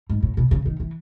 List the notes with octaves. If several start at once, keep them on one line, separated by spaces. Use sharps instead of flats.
G#2
A2
B2
C#3
D#3
E3